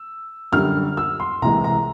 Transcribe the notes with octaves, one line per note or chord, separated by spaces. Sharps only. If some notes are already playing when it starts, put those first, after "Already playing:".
Already playing: E6
F#2 D3 G3 F6
E6
C6
C2 C3 E3 G#3 A#5
A#5